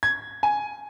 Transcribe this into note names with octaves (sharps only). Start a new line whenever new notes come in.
G#6
G#5